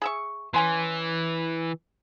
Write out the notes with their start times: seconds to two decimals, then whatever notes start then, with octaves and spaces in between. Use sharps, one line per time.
0.02 G#4 E5 C#6
0.54 E3 C#4 G#5 C6